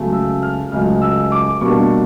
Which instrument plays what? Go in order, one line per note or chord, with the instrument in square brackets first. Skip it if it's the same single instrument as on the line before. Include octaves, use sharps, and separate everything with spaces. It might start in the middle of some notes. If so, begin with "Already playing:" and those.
Already playing: [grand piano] C#2 C#3 F#3 A3
E6
F6
C#2 C#3 F#3 A3 F6
E6
D6
B2 G3 A#3 D4 C#6